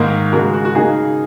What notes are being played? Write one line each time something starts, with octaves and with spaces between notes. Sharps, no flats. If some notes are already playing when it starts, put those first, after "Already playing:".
Already playing: G#2 D#3 A#3
C#3 G#3 F#4 A#4
F#4
F#4
C#3 A#3 D#4 G#4